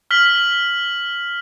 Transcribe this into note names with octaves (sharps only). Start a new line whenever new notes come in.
F6 B6 F#7